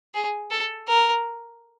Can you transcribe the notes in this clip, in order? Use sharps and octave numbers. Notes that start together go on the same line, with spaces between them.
G#4
A4
A#4